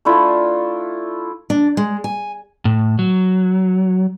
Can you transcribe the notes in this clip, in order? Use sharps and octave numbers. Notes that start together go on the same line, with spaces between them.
A3 D4 E4 F4
D4
G#3
G#5
A2
F#3